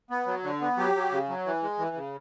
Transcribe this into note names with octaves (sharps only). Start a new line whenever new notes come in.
B3
F#3
D3
B3
F#3 G4
F#3
C#3
F#3
E3
G#3
E3
C#3